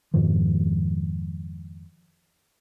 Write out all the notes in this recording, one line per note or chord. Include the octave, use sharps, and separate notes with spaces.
F2 G#2 D#3 F3